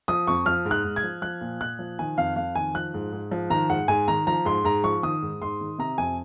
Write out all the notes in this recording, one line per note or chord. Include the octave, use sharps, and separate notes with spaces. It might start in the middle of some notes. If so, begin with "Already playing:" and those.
F3 D#6
F2 C#6
F3 F6
G#2
F#6
G#2
G#6
F3
F3 F#6
A#2
A#2 F#6
F3
D#3 G#5
F2 F5
F2 F5
D#3 G#5
F3 F#6
G#2
G#2
F3
D#3 A#5
G#2 F#5
G#2 G#5
D#3 A#5
F3 A#5
G#2 C6
G#2 A#5
F3 C#6
D#3 D#6
G#2
G#2 C6
D#3
C3 A#5
F2 G#5